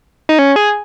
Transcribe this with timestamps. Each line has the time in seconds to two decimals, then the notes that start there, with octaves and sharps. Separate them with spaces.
0.29 D#4
0.39 C#4
0.56 G#4